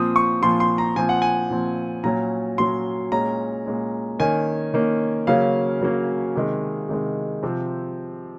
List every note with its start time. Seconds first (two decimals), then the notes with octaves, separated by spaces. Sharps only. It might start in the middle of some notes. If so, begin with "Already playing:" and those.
Already playing: A#2 F3 C4 D#6
0.16 C#6
0.42 A#2 F3 C4 C6
0.60 C6
0.78 A#5
0.96 A#2 F3 C4 G#5
1.09 F#5
1.22 G#5
1.50 A#2 F3 C4
2.03 A#2 F#3 C#4 A#5
2.58 A#2 F#3 C#4 C6
3.12 A#2 G#3 C#4 A#5
3.66 A#2 G#3 C#4
4.19 D#3 A#3 C#4 G#5
4.74 D#3 A#3 C#4
5.27 C#3 F#3 A#3 C#4 F5
5.81 C#3 F#3 A#3 C#4
6.35 C3 D#3 G#3
6.89 C3 D#3 G#3
7.43 C3 F3 C4